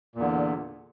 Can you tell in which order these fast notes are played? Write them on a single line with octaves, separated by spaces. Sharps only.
A#2 E2 D3